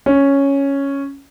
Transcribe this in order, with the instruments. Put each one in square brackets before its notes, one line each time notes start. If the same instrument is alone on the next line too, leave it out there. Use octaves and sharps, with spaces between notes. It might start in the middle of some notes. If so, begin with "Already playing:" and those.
[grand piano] C#4